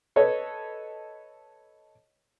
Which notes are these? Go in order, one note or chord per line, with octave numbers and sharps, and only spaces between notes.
A4 B4 C#5 D#5